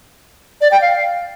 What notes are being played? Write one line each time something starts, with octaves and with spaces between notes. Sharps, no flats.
D5
G5
F5